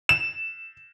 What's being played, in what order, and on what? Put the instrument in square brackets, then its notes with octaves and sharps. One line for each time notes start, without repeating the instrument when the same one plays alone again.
[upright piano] E7